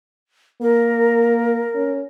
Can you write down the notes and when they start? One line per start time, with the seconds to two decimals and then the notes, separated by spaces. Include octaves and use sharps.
0.62 A#3 A#4
1.75 C#4